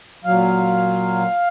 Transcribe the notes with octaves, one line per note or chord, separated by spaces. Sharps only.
A#2 F#3 F5